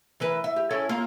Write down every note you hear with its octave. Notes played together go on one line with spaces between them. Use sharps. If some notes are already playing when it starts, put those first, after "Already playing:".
E3 A#4 B4
E5
G4
C#4 E4 A4
A#3 F4